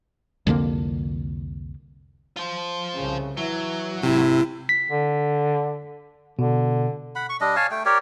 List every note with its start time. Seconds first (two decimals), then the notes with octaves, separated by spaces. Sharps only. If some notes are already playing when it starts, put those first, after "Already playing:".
0.47 C2 F2 D3 A#3
2.37 F4 C5
2.93 C2 C#3
3.37 E3 F#3 E4
4.03 G#1 C3 E4
4.69 B6
4.90 D3
6.39 B2 D3
7.15 F#5 B5
7.29 C#6
7.41 G3 D4 D#5
7.56 C#5 F5 G#5 A5
7.71 A3 G5
7.85 G4 A#4 C#5 D5